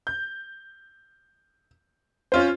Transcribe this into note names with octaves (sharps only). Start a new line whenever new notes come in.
G6
C#4 F4 C5